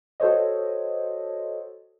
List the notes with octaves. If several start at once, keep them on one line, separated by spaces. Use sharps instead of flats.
F#4 A4 C5 C#5 D#5